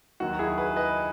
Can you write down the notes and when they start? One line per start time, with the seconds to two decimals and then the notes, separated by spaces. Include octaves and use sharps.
0.20 D#2 D#3 F#3 F#4
0.39 E4 G#4
0.58 G#4 B4
0.76 B4 D#5